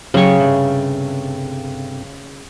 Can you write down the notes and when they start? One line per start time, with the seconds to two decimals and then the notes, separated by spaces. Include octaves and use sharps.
0.14 C#3 F#3 G4 C#6
0.40 G2 C3 A3